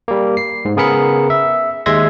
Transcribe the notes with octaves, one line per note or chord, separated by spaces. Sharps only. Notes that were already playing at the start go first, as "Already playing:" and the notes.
G3 A#3
C7
G#2
C#3 B3 G#4 A#4 B5 C#7
E5
D#2 G#3 E5 C6 G#6 A#6